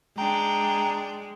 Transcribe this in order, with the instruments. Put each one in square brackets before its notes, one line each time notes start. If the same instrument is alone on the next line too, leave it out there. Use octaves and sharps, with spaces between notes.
[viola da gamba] G#3 [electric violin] D4 G5 [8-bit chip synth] A#5